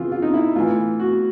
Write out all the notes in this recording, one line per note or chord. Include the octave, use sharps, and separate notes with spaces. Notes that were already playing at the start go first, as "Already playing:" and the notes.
Already playing: C#3 E3 F4
F4
D#4
E4
A2 E3 F4
F#4